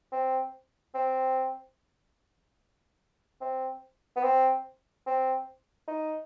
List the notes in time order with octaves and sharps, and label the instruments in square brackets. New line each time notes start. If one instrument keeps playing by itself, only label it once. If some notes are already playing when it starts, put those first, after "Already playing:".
[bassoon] C4
C4
C4
B3
C4
C4
D#4